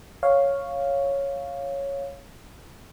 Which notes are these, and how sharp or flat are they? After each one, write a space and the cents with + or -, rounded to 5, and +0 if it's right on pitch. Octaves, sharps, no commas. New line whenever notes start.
C#5 +0 F5 +0